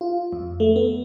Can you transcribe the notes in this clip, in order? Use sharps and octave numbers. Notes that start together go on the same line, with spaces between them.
F4
F2
A3
B3